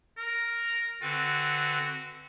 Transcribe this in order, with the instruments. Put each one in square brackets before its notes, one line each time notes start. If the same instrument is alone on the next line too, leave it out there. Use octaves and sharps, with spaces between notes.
[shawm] A#4
[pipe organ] D3 C4 B4 [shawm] F#4